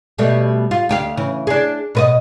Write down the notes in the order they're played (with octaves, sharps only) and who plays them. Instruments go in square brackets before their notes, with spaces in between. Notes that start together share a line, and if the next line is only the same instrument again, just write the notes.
[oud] B2 G3 A3
F4
D2 G4 F5
C#3 E3
D4 G#4
B2 B4 D#5